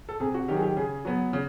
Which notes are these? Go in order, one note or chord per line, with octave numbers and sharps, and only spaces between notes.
A4
C3 G#4
F#4
D#3 F#3 G4
G#4
G4
C#3 G#4
F#3 B3
C#3